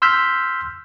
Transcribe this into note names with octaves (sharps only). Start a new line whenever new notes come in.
C6 E6 F6 G6 B6